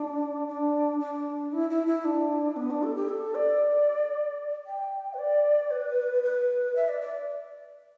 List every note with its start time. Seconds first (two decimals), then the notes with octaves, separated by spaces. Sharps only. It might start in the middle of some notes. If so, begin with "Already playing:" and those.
Already playing: D4
0.48 D4
1.00 D4
1.53 E4
1.70 E4
1.87 E4
2.05 D4
2.56 B3
2.70 D4
2.83 A4
2.96 G4
3.09 A4
3.35 D5
4.66 G5
5.14 B4
5.19 D5
5.71 B4
6.23 B4
6.76 E5
6.89 D5
7.01 D5